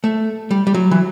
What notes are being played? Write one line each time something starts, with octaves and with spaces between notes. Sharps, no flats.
A3
G3
G3
F#3
E3